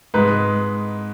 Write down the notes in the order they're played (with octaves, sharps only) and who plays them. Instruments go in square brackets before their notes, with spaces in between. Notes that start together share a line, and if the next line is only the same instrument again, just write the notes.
[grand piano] G#2 G#3 B4